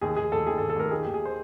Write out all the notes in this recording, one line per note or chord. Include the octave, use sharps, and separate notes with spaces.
D#2 G#4
D#2 G#4
D#2 A4
D#2 G#4
A4
D#2
A4
D#2 A#4
D#3 G#4
D#2 G4
G#4
C5